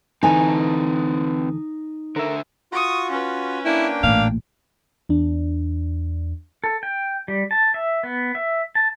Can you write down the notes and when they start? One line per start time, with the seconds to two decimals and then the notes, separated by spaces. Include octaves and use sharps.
0.23 D2 E3 C4 D#4 A4 B4 G#5 A5
2.16 D3 A4 A#4 E5
2.72 F4 F#4 C#6 D#6
3.10 C#4 B4
3.65 A#3 D4 E4 G5
4.03 A1 A#2 F5
5.09 E2 D4
6.64 A4
6.83 G5
7.28 G3
7.51 A5
7.74 E5
8.03 B3
8.35 E5
8.75 A5